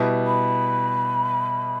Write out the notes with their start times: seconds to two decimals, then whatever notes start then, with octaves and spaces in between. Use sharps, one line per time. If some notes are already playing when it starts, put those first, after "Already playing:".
Already playing: B2 G3 B3 E4
0.26 B5